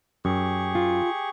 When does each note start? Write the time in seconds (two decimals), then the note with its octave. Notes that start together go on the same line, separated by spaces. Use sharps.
0.25 F#2 G4 G#4 C#6
0.75 F4